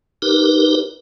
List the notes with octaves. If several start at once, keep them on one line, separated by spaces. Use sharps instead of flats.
D#4 G4 A#4 B4